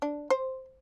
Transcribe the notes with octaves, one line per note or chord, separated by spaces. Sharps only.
D4
C5